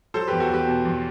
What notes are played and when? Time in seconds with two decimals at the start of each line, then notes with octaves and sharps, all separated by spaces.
0.14 F#3 A4 C5
0.27 E2 G4 B4
0.40 F#4 A4
0.49 E2 G4 B4
0.67 B2
0.85 E2